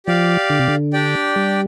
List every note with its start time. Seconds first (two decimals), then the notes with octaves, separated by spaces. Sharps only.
0.06 F3 G4 D5 F5
0.50 D3
0.59 C3
0.68 D3
0.93 D4 G4 D5 G5
1.36 G3